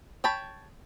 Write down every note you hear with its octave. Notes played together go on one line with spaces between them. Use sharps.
C#5 G5 A5 B5